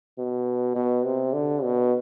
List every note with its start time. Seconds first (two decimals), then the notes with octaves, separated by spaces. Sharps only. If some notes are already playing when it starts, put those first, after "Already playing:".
0.18 B2
0.76 B2
1.05 C3
1.33 D3
1.63 B2